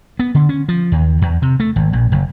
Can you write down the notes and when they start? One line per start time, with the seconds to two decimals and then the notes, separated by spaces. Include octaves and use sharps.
0.19 B3
0.35 D3
0.49 C#4
0.69 F3
0.92 D#2
1.22 E2
1.42 C3
1.60 A3
1.76 G#1
1.93 A#1
2.12 F#1